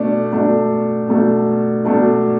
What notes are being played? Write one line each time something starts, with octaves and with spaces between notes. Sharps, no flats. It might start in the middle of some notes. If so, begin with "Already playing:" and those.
Already playing: B2 A3 D4
B2 A3 D4
B2 A3 D4
B2 A3 D4